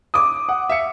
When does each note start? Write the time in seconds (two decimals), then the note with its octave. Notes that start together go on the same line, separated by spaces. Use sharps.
0.14 D6 D#6
0.49 F#5
0.69 E5 F5 C#7